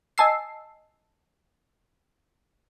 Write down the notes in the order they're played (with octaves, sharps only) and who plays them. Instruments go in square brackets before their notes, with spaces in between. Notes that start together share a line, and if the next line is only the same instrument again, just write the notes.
[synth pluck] D#5 G#5 A5 E6 C7